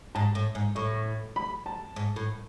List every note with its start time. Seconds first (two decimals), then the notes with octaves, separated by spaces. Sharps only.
0.15 G#2 A5
0.35 A2
0.55 G#2
0.75 A2 C#6
1.36 B5
1.66 A5
1.96 G#2
2.16 A2